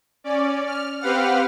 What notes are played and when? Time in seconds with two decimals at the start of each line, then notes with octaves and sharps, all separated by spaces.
0.24 C#4 D5
0.66 F6
1.00 C4 G4 B4 F5 F#5 F6